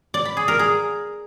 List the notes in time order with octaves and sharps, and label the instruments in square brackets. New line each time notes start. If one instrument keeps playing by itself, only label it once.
[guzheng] D5
B5
G#4
A#4
G#4